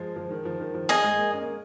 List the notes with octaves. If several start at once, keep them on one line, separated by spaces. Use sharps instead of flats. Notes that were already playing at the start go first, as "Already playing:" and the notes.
Already playing: F3 G#3
F3
D#3
F3
D#3
F3
G#4 D#5 G#5
G#3
A#3
C#4
A#3